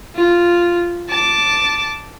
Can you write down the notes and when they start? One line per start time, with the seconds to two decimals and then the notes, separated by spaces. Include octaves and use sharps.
0.16 F4
1.09 A5 D6